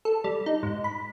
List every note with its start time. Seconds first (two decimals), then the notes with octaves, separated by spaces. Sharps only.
0.05 A4
0.24 G3
0.46 D#4
0.63 G#2
0.84 B5